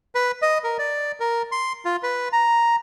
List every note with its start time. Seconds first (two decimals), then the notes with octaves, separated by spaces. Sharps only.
0.15 B4
0.42 D#5
0.64 A#4
0.79 D5
1.20 A#4
1.52 C6
1.85 F4
2.03 B4
2.33 A#5